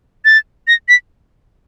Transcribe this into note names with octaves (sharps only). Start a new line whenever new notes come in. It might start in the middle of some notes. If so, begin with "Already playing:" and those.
A6
A#6
B6